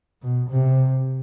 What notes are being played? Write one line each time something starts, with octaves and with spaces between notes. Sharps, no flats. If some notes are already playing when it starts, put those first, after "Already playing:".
B2
C3